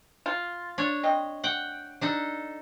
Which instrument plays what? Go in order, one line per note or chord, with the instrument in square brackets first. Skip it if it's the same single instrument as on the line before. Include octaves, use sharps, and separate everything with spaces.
[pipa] F4
[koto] D4 C#5
[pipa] C4 D#5
[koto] F#5 G5
D4 D#4 A4